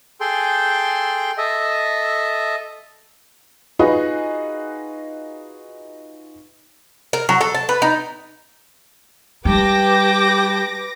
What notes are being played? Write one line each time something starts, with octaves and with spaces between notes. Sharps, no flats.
G#4 A4 G5 C6
A4 D#5 E5
D#4 F4 F#4 G#4 B4 D#5
A#4
F#3
A4
A5
B4
D#4
G3 G4 B4 G5 A5 D6 A#6